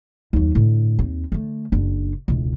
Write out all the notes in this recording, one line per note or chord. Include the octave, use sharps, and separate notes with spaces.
D#2 F#3
A2 D3
D#2 C4
D3 A3
F#1 D4
E1 C#2